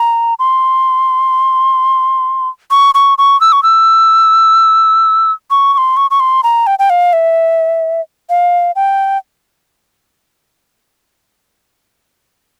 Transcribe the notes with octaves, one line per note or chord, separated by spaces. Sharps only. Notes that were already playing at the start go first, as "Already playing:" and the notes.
Already playing: A#5
C6
C#6
C#6
C#6
E6
C#6
E6
C#6
C#6
C6
C#6
C#6
C6
A#5
G5
G5
F5
E5
F5
G5